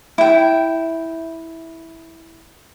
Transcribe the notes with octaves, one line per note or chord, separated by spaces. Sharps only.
E4 G5